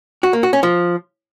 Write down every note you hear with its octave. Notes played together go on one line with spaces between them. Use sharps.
F#4
A#3
F#4
C#4
F3